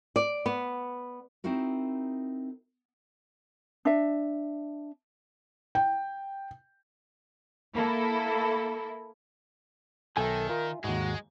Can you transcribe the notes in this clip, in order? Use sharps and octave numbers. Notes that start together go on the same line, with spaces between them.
D5
B3
C4 D#4 E4 F#4 A#4
D4 E5
G5
A#3 E4 A4
B1 D#3 A4 E5 G5 G#5
F4 A#4
D#2 G#2 G#3 F#4